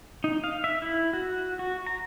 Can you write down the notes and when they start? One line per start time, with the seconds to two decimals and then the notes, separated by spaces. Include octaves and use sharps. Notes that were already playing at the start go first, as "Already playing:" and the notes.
0.24 D#4
0.44 F5
0.64 E5
0.82 E4
1.13 F#4
1.59 F#4
1.86 A#5